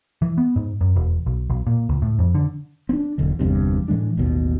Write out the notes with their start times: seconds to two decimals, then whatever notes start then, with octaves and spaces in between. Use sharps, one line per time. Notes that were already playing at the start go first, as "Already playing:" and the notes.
0.22 E3
0.38 B3
0.56 G#2
0.81 F#2
0.96 E1
1.26 B1
1.50 B1
1.67 A#2
1.89 C#2
2.02 A2
2.18 F2
2.34 D3
2.89 C4 D4
3.18 E1 B1 D3
3.39 G1 E2 G2 C3
3.88 A2 E3 G#3 D4
4.17 A1 D#2 B2